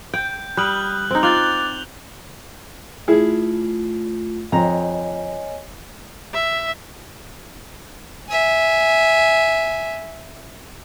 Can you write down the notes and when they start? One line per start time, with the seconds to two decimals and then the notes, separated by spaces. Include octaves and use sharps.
0.14 G5 G6
0.57 G3 B5 D#6 F6 F#6 F#7
1.11 C4 D#4
1.23 F4 D6 F#6 A6 F7 G7
3.08 A3 E4 F4 G#4
4.52 F2 C#5 D#5 G#5 A#5
6.34 E5
8.29 E5 G#5